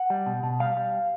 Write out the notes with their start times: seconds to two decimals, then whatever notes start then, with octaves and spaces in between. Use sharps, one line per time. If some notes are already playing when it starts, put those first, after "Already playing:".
Already playing: F#5
0.10 G3
0.26 B2
0.43 B2
0.60 G3 F5
0.77 G3